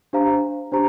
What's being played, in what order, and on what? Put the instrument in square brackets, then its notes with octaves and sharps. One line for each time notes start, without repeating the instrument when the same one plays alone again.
[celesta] D4 G4 C5 F5 A#5
D4 G4 C5 A#5